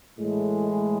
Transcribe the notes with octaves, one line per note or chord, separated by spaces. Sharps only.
A2 E3 G#3